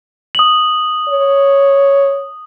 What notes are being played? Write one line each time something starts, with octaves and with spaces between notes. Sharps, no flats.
D#6 F#7
C#5